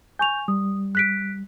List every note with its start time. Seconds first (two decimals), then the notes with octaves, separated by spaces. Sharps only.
0.19 G#5 C#6 G6 F7
0.48 G3 D#6
0.95 F#6 B6 D7